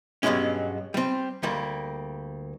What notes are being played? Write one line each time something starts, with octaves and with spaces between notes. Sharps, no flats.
G2 B2 E3 F#3 G#3 C#4
G3 C4
D2 G3 A#3